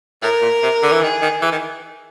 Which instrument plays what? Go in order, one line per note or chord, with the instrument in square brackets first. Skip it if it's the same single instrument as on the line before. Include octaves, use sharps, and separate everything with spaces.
[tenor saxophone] A2 [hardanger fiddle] A#4
[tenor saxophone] A#2
C3
D3
E3
[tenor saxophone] D#3 [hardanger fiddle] G#4
[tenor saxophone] D#3
E3
D#3